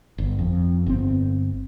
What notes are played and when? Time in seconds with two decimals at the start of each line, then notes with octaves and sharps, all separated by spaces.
0.18 G1
0.39 F2
0.86 G1 C4